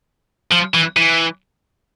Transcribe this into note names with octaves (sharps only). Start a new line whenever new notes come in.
F3
E3
E3